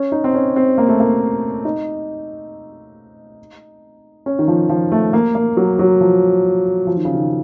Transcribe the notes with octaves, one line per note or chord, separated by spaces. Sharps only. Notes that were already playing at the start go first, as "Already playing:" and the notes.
Already playing: C#4
D#4
C4
C#4
C4
A#3
A3
A#3
D#4
C#4
D#3
F3
F3
A3
A#3
A#3
F#3
F#3
F3
F3
D#3
C#3
D#3